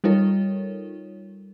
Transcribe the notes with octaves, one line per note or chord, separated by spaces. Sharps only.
G3 D#4 F4 A4 A#4 C#5